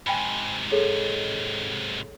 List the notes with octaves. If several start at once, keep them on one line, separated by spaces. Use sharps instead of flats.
G#2 C3 G5 G#5 B5
G#4 A4 C#5